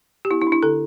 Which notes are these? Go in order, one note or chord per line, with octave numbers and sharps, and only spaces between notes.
G4
B3 E4
E4
D4
E4
D3 A4